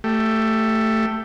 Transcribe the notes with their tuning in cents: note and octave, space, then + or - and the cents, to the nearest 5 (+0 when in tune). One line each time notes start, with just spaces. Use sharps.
A3 +10 G4 +0